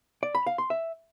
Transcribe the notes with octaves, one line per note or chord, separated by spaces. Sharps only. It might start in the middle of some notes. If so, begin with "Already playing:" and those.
D5
B5
F5
C6
E5